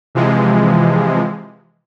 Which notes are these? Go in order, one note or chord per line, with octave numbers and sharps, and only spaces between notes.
C3 E3 F3 G#3